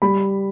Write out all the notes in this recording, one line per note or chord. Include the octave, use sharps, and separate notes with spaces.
G3 B5